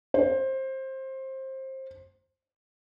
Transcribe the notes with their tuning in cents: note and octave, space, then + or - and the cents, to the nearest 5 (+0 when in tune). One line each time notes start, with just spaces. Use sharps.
C5 +20